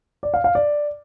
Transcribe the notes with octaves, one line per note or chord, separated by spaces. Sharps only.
D5
F5
F5
D5